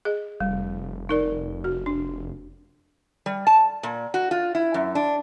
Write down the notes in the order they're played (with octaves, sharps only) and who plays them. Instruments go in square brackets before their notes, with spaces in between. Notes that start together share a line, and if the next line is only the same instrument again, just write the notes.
[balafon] G#4 D#5
[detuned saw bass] F1 [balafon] G3
[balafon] D#4 A#4 D5
F#4
D4
[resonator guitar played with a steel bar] G3
A5
A#2
F#4
F4
E4
F#2
D4